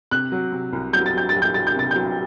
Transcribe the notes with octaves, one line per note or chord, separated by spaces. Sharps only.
C3 F#6
F#3
C3
C2
F#3 G6
A6
F#3 G6
F#3 A6
G6
F#3 A6
G6
C3 A6
F#3 G6